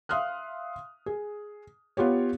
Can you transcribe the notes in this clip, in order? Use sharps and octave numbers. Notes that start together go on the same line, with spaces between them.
E5 F5 C6 D#6 F6 F#6
G#4
B3 F4 G4 C#5